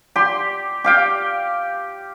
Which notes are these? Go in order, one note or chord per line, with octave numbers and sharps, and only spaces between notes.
G4 C6
G4 F5 G5